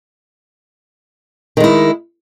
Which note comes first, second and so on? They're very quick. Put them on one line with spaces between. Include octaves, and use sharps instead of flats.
D#3 G#3 E4